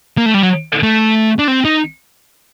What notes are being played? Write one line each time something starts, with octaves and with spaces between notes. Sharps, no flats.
A#3
A3
G3
F#3
A3
D4
C4
D#4